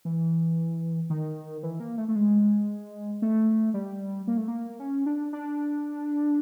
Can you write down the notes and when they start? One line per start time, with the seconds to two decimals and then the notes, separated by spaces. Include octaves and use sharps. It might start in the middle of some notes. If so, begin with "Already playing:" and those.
0.05 E3
1.10 D#3
1.63 E3
1.80 A#3
1.98 A3
2.08 A3
2.16 G#3
3.22 A3
3.74 G3
4.27 A#3
4.38 A3
4.48 A#3
4.80 C#4
5.06 D4
5.33 D4